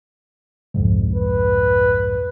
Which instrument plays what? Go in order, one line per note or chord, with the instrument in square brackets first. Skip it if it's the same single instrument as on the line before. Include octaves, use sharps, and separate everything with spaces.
[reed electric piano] C2 F2 G#2
[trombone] B4